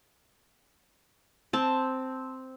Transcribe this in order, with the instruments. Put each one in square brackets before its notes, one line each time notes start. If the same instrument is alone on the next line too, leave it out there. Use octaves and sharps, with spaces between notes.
[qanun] C4 A5